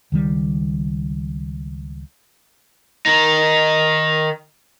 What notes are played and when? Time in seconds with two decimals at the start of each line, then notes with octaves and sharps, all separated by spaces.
0.12 C#2 D#3 G3
3.06 D#3 D#4